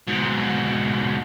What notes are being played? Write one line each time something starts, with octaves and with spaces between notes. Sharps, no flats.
G#2 B2